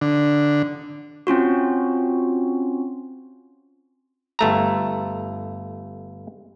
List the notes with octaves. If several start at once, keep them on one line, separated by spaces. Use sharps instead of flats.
D3
C4 C#4 F4 F#4
G1 A3 A#5